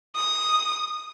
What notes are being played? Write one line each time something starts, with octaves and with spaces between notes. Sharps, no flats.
D#6